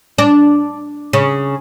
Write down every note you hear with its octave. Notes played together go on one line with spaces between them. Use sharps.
D4
C#3